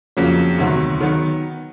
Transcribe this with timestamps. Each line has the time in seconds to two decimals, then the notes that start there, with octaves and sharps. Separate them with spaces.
0.17 F2 C#3 F#3 A#3
0.58 D2 C3 D#3 F#3 B3
1.00 D#3 F#3 B3